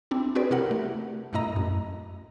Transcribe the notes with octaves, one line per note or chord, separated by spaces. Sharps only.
C4 D4 E4
C4 F#4 G#4 B4 D5
C3 E4 G4 A#4 F#5
A3
G2 A#2 A3 E4 D#5 A#5
F#2